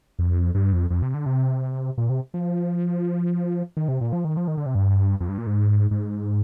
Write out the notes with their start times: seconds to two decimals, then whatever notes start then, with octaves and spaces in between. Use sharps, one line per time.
0.19 F2
0.55 G2
0.73 F2
0.90 F2
1.02 C3
1.14 D3
1.26 C3
1.98 A#2
2.10 C3
2.34 F3
3.77 D#3
3.88 C3
4.01 A#2
4.13 F3
4.25 D#3
4.37 F3
4.48 D#3
4.57 D3
4.66 C3
4.75 G2
5.20 F2
5.29 G2
5.38 A#2
5.47 G#2
5.91 G#2